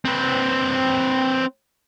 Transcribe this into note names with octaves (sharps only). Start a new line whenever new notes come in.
C4 B4